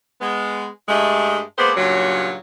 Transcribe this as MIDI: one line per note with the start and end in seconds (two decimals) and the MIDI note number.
0.21 0.65 56
0.21 0.65 59
0.88 1.39 43
0.88 1.39 56
0.88 1.39 57
1.58 1.71 56
1.58 1.71 58
1.58 1.71 59
1.58 1.71 68
1.58 1.71 72
1.58 1.71 74
1.76 2.36 43
1.76 2.36 46
1.76 2.36 49
1.76 2.36 54